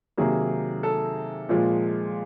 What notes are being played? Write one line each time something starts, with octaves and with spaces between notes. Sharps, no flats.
C3 D#3 F#3 A#3 G#4
A4
A#2 F3 G#3